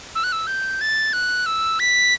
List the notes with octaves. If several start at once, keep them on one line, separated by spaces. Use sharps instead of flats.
E6
F#6
E6
G6
A6
F#6
E6
B6